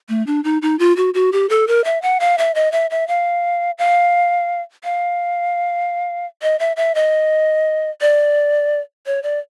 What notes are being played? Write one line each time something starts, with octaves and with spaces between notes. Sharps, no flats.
A3
D4
D#4
D#4
F4
F#4
F#4
G4
A4
A#4
E5
F#5
F5
E5
D#5
E5
E5
F5
F5
F5
D#5
E5
E5
D#5
D5
C#5
D5